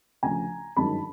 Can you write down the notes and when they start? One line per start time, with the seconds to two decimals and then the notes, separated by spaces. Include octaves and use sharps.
0.23 D2 C#3 F3 A3 G#5 A#5
0.76 G1 F#2 D#3 G#3 C#4 A5 B5